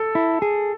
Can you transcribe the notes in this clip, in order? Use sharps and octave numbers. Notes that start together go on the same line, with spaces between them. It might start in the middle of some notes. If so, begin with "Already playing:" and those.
Already playing: A4
E4
G#4